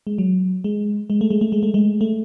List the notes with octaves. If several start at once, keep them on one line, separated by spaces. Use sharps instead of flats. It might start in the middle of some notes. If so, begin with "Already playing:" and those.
G#3
F#3
G#3
G#3
A3
G#3
A3
G#3
A3
G#3
A3